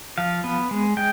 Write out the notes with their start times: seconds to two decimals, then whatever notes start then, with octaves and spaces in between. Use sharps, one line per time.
0.18 F3 F5
0.44 B3
0.71 G#3
0.97 G#3 G5